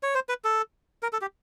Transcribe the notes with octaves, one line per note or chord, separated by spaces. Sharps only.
C#5
C5
B4
A4
A#4
A4
G4